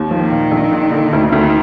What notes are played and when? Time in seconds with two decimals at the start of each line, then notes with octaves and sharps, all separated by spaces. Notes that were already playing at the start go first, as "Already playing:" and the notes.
Already playing: D#2
0.11 D#3 F3
0.32 A#2
0.51 A#1
0.71 A#2
0.92 D3
1.13 D2
1.32 D2 D#3